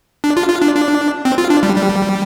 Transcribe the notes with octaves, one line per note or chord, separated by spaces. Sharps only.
D4
F4
F4
D4
D4
C4
F4
D4
G3
G3